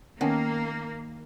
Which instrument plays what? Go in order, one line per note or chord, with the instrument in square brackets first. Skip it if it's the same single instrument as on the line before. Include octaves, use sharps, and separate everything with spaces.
[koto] D#3 [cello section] A#3 [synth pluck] B3 C#4 A5